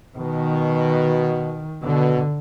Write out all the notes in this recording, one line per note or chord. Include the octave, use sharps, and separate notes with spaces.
B2 D#3
B2 D3